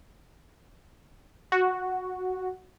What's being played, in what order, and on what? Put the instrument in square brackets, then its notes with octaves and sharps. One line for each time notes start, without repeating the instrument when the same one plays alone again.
[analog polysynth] F#4